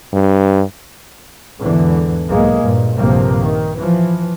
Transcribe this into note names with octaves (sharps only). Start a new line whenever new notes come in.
G2
E2 G#2 D3 E3
B1 G#2 G#3 A#3
G2 A#2
A#1 G2 C3 F3 A#3
D#3
E3 F3